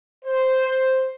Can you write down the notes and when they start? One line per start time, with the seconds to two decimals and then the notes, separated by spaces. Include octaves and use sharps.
0.24 C5